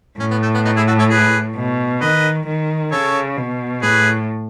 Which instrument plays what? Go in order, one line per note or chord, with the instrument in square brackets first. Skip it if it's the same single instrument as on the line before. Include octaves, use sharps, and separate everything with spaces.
[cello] A2 [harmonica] C#4
[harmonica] B3
A3
B3
B3 D#4
E4 G#4
F#4 A4
A4 C#5
G#4 B4
[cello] B2
[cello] D#3 [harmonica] B4 D#5
[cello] D#3
[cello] C#3 [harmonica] A4 C#5
[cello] B2
[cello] A2 [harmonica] G#4 B4